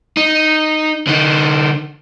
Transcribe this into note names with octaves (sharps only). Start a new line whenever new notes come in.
D#4
D3 D#4